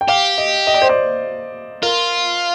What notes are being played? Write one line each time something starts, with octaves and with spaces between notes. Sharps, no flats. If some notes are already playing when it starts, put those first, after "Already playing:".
G5
G4 F5
D#5
D#5
D5
C5
D5
F4 A#4